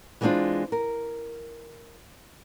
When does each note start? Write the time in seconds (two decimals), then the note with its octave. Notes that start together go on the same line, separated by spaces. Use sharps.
0.21 E3 G#3 B3 C4 D4 F4
0.72 A#4